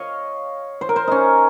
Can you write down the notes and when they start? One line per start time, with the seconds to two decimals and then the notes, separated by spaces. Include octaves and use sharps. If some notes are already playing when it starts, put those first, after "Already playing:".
Already playing: C#5 D#5 F5
0.81 C5
0.89 A#4
0.96 C5
1.08 C#4 D#4